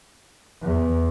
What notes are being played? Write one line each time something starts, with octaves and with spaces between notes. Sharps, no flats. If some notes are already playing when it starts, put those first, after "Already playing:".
E2